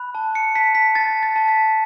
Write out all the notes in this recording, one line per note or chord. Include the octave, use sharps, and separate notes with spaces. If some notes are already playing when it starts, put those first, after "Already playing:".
Already playing: B5 F#6
A5
C#7
A5 B6
B6
A5 A6
A6
A5
B6